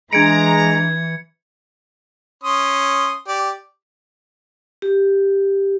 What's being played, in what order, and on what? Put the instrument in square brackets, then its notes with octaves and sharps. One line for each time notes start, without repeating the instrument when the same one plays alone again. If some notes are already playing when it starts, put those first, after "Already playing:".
[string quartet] E3 [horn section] G#3 A#5 [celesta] D4 G#4 D7 [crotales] G#6 C#7
[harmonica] C#4 C6 D#6
G4 D5
[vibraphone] G4